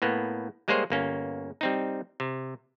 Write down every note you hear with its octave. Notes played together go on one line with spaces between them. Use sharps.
A2 A#3 B3
G3 G#3 A#3 G#4 C5 C#5
G1 A#3 C#4
G3 C4 D#4
C3